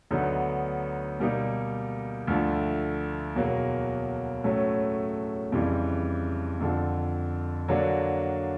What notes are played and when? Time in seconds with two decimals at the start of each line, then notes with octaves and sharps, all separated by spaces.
0.11 D2 D3 F#3 B3 D#4
1.19 B2 G3 A#3 D#4
2.27 D2 D3 F3 A3
3.35 E2 B2 F#3 A#3
4.44 A2 F#3 A3 C#4
5.52 F2 C#3 E3 G3
6.60 F2 D3 F3
7.68 D3 F#3 A#3 D4